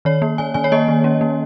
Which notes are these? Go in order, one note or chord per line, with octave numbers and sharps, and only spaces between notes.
D#3 C#5
A#3
D#3 G#5
D#3 G#5
C#5
A#3 D#5
D#3
C#4
A#3